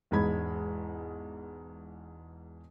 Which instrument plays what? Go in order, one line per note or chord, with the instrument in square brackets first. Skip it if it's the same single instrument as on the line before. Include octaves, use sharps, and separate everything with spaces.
[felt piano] E1 E2 G#2 G#3 B5 G#6